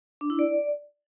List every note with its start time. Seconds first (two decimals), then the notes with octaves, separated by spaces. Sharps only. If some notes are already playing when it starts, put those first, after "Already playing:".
0.21 D4
0.30 E4
0.39 D5